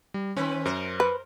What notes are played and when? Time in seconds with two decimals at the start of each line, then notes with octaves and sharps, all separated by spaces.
0.14 G3
0.36 D#3 C4 C#4 B4
0.65 F#2 A#4 C5
1.00 B4